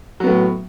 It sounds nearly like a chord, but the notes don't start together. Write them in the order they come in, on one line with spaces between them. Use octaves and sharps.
F#3 B3 A2